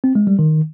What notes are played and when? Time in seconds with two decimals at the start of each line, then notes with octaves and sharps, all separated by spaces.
0.04 C4
0.15 G#3
0.27 G3
0.39 D#3